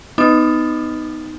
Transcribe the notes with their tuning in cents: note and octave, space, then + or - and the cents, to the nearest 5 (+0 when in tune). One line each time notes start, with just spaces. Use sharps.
B3 +20 D#4 +0 D6 +40